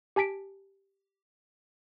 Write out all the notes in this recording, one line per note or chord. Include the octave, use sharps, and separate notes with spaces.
G4 G#5 A5 B6 D7